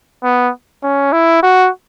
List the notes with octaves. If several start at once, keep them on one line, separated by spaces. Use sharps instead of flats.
B3
C#4
E4
F#4